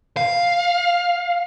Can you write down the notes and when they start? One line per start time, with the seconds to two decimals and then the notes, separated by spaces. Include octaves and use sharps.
0.17 F5